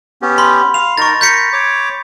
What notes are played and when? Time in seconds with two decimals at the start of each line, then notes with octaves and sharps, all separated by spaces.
0.22 B3 C#4 G4
0.38 B5 C6
0.74 F5 F7
0.98 D#4 A#4 C#6 A6
1.21 A#4 G6 B6 C#7
1.53 C#5 D6